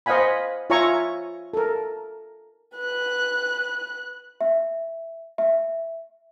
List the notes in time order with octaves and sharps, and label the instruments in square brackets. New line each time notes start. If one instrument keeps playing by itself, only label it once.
[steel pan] C5 D#5 F5 F#5 G#5 B5
F4 C#5 E5 G#5 A#5 C#6
A4 A#4
[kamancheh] B4 F#6
[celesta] E5
E5